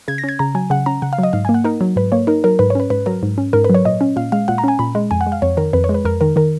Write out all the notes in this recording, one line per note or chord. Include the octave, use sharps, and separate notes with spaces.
C#3 G#6
A#6
C#4 G#6
C#3 A#5
F#3 G#5
C#3 F#5
C#4 A#5
C#3 F#5
F5
F#3 D#5
G#2 F5
A#3 G#5
F#5
D#4 A#4
F#3
G#2 B4
A#3 C#5
D#4 A#4
F#3 A#4
G#2 B4
C#5
C#4 B4
G#2 B4
F#3 A#4
G#2
C#4
G#2 A#4
B4
F#3 C#5
A#2 D#5
C#4
A#2 F5
G#3 F5
A#2 F#5
A#5
C#4 G#5
A#2 B5
G#3
F2 G#5
F#5
G#3
F5
F2 C#5
D#3 A#4
F2 B4
C#5
G#3
B4
F2 A#4
D#3 A#4
D#3 A#4